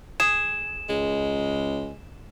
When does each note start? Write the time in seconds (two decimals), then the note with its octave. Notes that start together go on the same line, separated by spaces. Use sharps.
0.20 G#4 E7
0.89 C#2 G#3